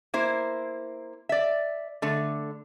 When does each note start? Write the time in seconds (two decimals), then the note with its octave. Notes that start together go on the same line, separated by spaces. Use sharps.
0.14 A#3 E4 C5
1.29 D5 E5
2.02 D3 A3